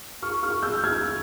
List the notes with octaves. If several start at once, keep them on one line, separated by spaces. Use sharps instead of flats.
C#6 F6
C#6 F6
E6 G6
F6 G#6